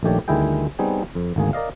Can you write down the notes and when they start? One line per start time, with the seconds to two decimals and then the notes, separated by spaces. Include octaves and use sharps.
0.03 A#1 D#3 A3 G4 C#5 D5
0.28 D2 D#3 G3 E4 G#4 G5
0.79 G3 B3 C4 D#4 G#4
1.15 F2
1.36 G#1 D2 A#3 G#4
1.53 A#4 D5 D#5 F5